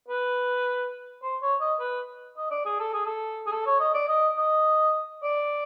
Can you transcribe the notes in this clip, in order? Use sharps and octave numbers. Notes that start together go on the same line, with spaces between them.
B4
C5
C#5
D#5
B4
D#5
D5
G#4
A4
G#4
A4
G#4
A4
C#5
D#5
D5
D#5
D#5
D5